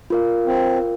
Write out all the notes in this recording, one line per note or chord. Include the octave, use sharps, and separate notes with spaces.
F4 A#4 F5
C4